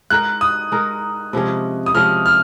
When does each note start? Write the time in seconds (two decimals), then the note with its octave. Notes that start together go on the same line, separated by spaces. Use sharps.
0.10 G#3 D#4 A#4 F#6
0.41 D#6
0.72 G#3 D#4 A#4
1.33 C3 F3 G#3 C#4
1.86 D#6
1.94 C3 F3 G#3 C#4 F6
2.26 F6